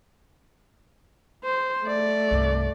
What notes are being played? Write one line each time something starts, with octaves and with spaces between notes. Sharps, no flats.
C5
A3 D5
C2 G2